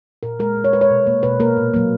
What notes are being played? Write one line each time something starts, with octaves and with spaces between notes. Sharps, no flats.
A#2 A#4
G#3 A#4
A#2
C#5
G#3 B4
C#5
B2
A#3
B2 B4
A#3 A#4
A#2
F#3 A#3